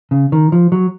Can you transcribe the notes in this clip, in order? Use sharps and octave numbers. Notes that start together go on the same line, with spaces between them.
C#3
D#3
F3
F#3